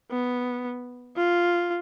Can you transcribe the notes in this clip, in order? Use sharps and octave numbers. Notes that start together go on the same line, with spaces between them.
B3
F4